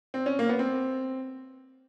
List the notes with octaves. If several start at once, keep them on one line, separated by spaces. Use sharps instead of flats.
C4
C#4
A#3
B3
C4